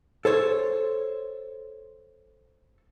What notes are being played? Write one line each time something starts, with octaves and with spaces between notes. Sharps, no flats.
A4 C5 C#5